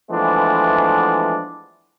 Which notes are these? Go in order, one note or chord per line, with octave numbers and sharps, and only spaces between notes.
E3 F3 G#3 A3 B3 D4